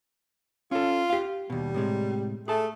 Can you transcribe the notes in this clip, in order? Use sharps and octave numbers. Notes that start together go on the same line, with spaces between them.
C#4 F4 A4
G4 F5
D#2 B2 G3
A2 C3 G#3
A3 G#4 A5